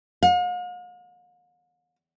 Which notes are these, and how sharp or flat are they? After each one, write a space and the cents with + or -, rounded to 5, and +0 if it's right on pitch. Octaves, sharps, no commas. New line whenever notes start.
F5 +45